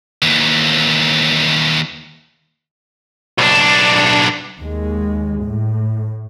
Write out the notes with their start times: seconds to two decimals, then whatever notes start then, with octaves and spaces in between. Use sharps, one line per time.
0.23 D#2 E3
3.39 B1 D4
4.60 D#2 G#3
5.44 A2